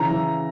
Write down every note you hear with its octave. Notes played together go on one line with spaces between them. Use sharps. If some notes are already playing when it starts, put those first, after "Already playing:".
Already playing: C#3 E3 A#5
E3